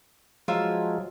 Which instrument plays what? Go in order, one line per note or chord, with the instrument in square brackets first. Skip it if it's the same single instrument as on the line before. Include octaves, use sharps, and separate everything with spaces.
[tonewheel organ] F3 F#3 G#3 [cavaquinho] F4 A#4 E5